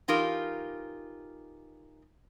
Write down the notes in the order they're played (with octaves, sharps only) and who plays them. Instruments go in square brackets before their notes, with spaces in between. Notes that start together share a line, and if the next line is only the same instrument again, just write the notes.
[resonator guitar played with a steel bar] E3 D#4 F4 G4 A#4